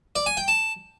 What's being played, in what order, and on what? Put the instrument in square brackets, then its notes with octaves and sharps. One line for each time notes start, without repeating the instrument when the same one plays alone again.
[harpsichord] D5
G#5
G5
A5